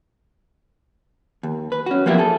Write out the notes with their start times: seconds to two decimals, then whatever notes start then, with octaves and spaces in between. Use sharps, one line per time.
1.43 D#2
1.72 B4
1.86 C#4 F#4
2.06 F3 F#3 A#3 B3 E4 G4
2.18 G#4 A4